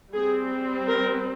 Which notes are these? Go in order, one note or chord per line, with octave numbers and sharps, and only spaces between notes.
G3 C4 G#4
A#4